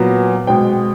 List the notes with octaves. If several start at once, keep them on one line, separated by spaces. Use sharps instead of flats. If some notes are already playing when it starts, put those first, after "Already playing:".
Already playing: A#2 F#3 B3
B2 G#3 C4 G5